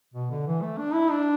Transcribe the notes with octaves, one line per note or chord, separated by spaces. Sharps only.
B2
D3
E3
A3
D4
E4
D4